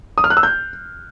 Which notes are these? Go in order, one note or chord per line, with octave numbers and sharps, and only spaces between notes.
D#6
F6
F#6
E6
G6